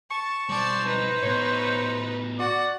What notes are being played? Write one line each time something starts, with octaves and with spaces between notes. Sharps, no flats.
A5 C#6
B1 G3 C5 D5 A5
D#4 B4
A2 B3 C#5
F#4 D5 F#5